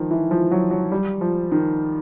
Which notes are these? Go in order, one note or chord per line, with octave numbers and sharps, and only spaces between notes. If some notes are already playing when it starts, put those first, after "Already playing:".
Already playing: D#3 F3
E3
F3
F#3
F#3
G3
F3
D#3